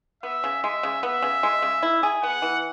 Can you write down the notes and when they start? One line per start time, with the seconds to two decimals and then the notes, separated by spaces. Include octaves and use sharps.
0.23 B3 E5
0.44 C#3
0.63 G#3 E5
0.83 C#3
1.03 B3 E5
1.22 C#3
1.43 G#3
1.62 C#3
1.83 E4
2.03 G#4
2.23 B3 F#5
2.42 E3